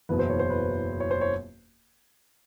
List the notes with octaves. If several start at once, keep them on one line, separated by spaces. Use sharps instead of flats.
F#1 E2 B2 B4
C5
C#5
C5
B4
C#5
C5
C#5